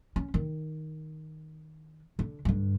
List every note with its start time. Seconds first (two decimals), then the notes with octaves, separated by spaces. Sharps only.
0.16 C#4
0.34 D#3
2.19 D3
2.45 G2 D3